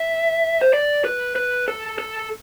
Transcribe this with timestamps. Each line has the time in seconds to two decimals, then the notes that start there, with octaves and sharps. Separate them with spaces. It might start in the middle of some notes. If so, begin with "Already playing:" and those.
Already playing: E5
0.61 C5
0.73 D5
1.05 B4
1.36 B4
1.68 A4
1.99 A4